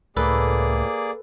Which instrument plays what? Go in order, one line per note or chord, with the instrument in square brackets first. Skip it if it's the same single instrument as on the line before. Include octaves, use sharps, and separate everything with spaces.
[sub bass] C#2 [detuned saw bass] A2 [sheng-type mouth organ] A#3 G#4 D5 [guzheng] A4 B4